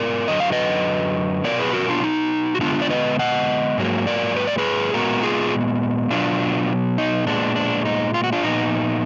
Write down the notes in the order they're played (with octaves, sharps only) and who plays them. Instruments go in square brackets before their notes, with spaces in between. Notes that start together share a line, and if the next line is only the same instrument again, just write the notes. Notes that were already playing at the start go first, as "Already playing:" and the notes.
Already playing: [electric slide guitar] G#2 B3 A#4 D5
F#2 D3 F#3 D#5
F5
B4 D#5
B2 F#3 B3 A#4 D5
G#4 B4
F#4 A#4
D4 F4
D#4
F#4
D3 G#3 B3 D4 F4
D5
B4 D#5
D#5 F#5
G#2 F#3 A#3
A#4 D5
B4
D5
G#4 B4
A#2 G#3 B3 F#4 A#4
F4 G#4
B2 F#3 B3 D4 F4
D#4
A#2 G#3 B3 D4
D4
D#4
F4
F#4
D4 F4
A#2 F3 B3 D#4